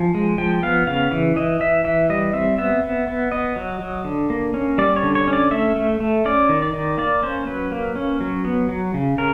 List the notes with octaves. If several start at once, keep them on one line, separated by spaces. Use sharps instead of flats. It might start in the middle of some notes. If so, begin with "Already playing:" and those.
Already playing: F3 G#5
G#3
F3 G5
B3 F5
C#3 F5
E3
E3 D#5
E3 E5
E3 E5
G3 D#5
C4 E5
B3 E5
B3
B3
B3 D#5
F#3
F#3
D3
A#3
C#4
G3 D5
C#5
D3
C#5
C#4
D5
A3 E5
A3
A3
C#4 D5
D#3
D5
D#3
A#3 D5
C#4 C5
F#3 B4
A#3
C#4
F#3
B3
F#3
C#3
C#3 A#4